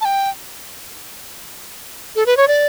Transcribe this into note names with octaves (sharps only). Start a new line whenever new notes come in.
A5
G5
A4
B4
C#5
D5